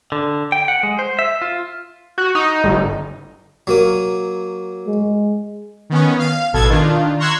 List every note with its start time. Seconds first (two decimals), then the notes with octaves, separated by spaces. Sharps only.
0.12 D3
0.52 G5
0.68 F#5
0.83 G#3
0.99 C5
1.19 E5
1.42 F4
2.18 F#4
2.35 D#4
2.64 G1
3.67 F#3 A#3 D#6
4.87 G#3
5.90 D#3 B3 C#4
6.19 F5
6.53 A1 B2 A4 A5 G#6
6.69 D#3 D4 F4
7.19 A#5 C6 C#6 E6 F#6 G#6